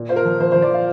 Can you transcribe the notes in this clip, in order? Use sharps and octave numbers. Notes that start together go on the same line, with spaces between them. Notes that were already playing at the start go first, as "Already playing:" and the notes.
Already playing: A#2
F4 C5
A#4
F3
F3 C5
C5
F3
D5
F4 F5